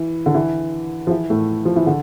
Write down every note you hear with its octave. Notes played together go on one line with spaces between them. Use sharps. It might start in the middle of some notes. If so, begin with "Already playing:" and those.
Already playing: E3
D3
E3
F3
E3
A2 A3
F3
E3
D3